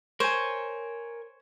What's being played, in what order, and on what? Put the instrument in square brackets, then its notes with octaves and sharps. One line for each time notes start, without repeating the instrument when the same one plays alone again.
[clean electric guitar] A#4 G#5 [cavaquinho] C5 C#5